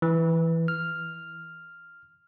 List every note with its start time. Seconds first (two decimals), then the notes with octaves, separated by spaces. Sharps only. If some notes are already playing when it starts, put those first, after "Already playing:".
0.02 E3
0.68 F6